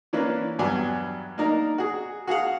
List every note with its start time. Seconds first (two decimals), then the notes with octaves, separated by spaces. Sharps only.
0.13 E3 A#3 C#4 D4 B4
0.59 E2 G2 F#3 G#5
1.38 A#3 D4 D#4 A#4
1.78 F#4 G#4
2.27 F#4 G#4 F5 F#5